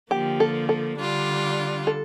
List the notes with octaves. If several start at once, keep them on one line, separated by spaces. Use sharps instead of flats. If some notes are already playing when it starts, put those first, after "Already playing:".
D3 F3 A#3 G4
A4
A4
D3 G3 D4 F4
A4